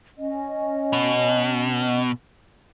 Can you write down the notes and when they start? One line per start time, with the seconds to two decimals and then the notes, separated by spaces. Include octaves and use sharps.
0.18 C#4 D#5
0.93 B2